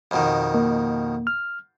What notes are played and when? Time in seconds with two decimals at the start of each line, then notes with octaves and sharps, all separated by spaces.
0.11 F2 B2 D#3
0.54 A#3
1.27 F6